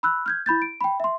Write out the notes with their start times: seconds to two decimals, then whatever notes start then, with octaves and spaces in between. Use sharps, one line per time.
0.03 B5 E6 F#6
0.26 F6 G6 G#6
0.46 E4 B5 G6 A6
0.62 D7
0.81 G5 B5
1.00 E5 C6